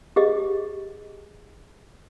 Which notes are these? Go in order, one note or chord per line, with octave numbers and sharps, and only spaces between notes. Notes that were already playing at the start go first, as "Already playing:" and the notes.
G4 G#4 D#5